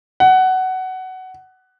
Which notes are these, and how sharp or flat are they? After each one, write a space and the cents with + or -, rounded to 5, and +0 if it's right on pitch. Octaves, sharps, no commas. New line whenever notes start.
F#5 +15